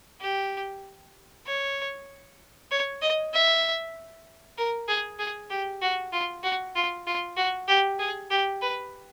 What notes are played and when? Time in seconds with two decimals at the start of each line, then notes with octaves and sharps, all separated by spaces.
0.21 G4
1.46 C#5
2.71 C#5
3.01 D#5
3.33 E5
4.58 A#4
4.88 G#4
5.19 G#4
5.50 G4
5.82 F#4
6.13 F4
6.43 F#4
6.75 F4
7.07 F4
7.37 F#4
7.68 G4
7.99 G#4
8.30 G4
8.62 B4